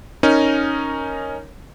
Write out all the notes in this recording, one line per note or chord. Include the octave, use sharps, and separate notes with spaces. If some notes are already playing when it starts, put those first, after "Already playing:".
C#4 D#4 A#4